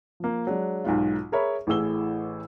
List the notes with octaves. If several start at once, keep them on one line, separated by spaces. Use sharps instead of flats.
F3 A#3
F#3 G#3 D4
B1 G#2 F4
G#4 A#4 C#5 E5 B5
A1 A2 E3 G#4 E6 G7